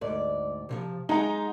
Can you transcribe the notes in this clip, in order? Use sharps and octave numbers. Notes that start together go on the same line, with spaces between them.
D2 G#2 D5
C3 E3 F3
G#3 D#4 F#5 A#5